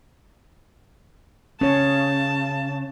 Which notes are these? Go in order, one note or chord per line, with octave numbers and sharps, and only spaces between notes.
C#3 C#4 C#5 A5